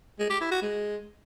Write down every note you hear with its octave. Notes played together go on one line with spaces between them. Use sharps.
G#3
G4
E4
F#4
G#3